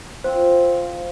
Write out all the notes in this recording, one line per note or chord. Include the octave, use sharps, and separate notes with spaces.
C4 F4 C5